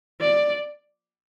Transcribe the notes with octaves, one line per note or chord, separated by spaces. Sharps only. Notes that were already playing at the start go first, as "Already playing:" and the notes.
D5